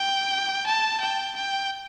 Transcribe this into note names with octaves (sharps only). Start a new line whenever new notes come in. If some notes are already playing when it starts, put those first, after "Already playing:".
Already playing: G5
A5
G5
G5